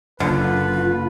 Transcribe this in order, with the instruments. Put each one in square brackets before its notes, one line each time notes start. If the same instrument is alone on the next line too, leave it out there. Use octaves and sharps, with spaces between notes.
[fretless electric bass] F#1 [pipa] D3 [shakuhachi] F4 [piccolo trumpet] B4